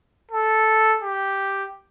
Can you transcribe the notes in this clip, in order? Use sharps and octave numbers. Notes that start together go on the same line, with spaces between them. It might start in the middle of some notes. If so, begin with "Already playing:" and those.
A4
G4